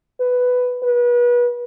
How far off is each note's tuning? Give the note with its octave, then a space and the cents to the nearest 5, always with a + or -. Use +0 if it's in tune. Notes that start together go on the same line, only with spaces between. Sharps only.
B4 +5
B4 -30